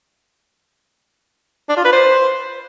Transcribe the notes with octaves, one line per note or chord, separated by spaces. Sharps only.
D4
F4
B4
C5